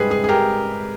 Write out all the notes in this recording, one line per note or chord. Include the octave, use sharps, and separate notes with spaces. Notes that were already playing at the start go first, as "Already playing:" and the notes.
Already playing: G#2 G3 G#4 B4
G#4
G#4
G4 A#4